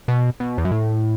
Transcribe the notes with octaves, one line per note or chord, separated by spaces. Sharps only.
B2
B2
E2
F#2
A2